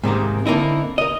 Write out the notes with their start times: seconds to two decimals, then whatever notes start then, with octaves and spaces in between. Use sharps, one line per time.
0.04 G#2 C3 D#3 A#3
0.46 D3 A#3 C4 D#4 E4
0.98 A#4 D#5